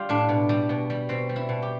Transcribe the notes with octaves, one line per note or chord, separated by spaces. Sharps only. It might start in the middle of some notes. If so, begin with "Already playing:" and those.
Already playing: G3 F4 G4
A2 D4
B2
G3
B2
G3
B2 C4
G3
E4
B2
G4